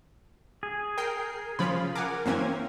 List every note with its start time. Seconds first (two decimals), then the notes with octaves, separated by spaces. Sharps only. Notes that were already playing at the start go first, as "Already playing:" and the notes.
0.63 G#4
0.98 A#4 G5 C7
1.59 C#3 F3 F4 B5
1.95 A#4 F#5 G#5 D6
2.26 F#2 E3 A#3 C4 C#4 G#6